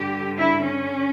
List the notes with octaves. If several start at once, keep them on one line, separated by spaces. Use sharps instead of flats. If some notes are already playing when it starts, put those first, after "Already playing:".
Already playing: G2 D3 G4
E4
C#4